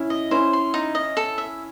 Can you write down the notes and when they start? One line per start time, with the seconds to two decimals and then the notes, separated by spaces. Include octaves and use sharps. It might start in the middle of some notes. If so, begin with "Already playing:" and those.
Already playing: C#4 E4
0.10 D#5
0.31 C#4 E4 C5
0.53 C6
0.74 D#4
0.95 D#5
1.17 A4
1.38 E5